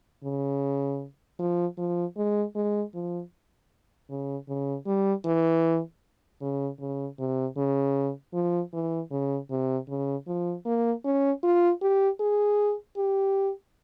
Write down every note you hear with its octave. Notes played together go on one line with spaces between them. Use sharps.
C#3
F3
F3
G#3
G#3
F3
C#3
C#3
G3
E3
C#3
C#3
C3
C#3
F3
E3
C#3
C3
C#3
F3
A#3
C#4
F4
G4
G#4
G4